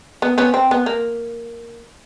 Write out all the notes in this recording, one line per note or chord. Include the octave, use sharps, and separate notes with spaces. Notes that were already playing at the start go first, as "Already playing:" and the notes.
B3
B3 C#4
C4
B3
A#3